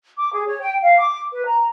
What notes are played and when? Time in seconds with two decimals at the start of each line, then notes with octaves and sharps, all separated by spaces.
0.17 D6
0.33 G#4
0.47 C#5
0.60 G5
0.82 F5
0.98 D6
1.31 B4
1.45 A#5